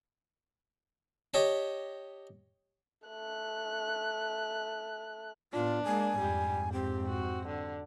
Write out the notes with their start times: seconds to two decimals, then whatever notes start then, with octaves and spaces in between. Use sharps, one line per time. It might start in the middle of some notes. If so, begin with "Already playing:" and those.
1.34 G4 C#5 D#5 G5 A5
3.08 A3 F#6
5.53 A2 B3 D4 F4
5.84 G#3 A#3 G#5
6.19 F2 G#2 G3
6.73 C4 G4
7.09 F#4
7.46 D3